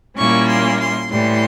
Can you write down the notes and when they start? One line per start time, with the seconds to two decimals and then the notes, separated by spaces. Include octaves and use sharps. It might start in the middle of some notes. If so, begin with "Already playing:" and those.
0.17 A#2 G3 A#3 C#4 E4 C#6
0.48 C6
0.79 C6
1.10 A2 E3 G3 C6